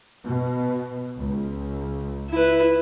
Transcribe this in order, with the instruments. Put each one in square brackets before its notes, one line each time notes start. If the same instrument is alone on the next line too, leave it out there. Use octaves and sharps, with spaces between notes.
[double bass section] B2
C#2
[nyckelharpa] E4 B4